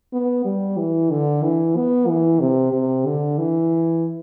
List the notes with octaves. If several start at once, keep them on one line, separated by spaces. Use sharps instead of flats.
B3
G3
E3
D3
E3
B3
E3
C3
C3
D3
E3